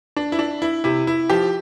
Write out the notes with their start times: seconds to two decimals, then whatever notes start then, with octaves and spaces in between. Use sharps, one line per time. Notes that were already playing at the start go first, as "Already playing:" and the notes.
0.16 D4
0.32 E4
0.39 D4
0.62 E4
0.84 C3 E4
1.07 E4
1.30 F3 G4